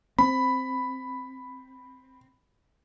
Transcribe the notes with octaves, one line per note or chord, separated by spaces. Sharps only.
C4 B5